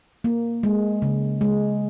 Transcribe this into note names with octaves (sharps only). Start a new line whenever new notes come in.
A#3
G#3
C#3
G#3